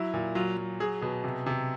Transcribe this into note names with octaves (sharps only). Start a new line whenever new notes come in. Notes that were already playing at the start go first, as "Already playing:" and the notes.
Already playing: F#3 E4
A#2
F#3 F4
F#3
F#3 G#4
B2 G#4
C3
C3